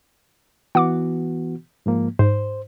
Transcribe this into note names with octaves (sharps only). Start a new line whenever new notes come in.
E3 B3 F#4 F#5 D6
G#2 F3 A#3
G#2 C5